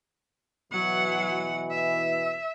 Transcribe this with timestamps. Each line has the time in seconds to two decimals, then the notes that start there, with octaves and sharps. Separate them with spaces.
0.72 B2 E3 F#3 F#5
1.71 E5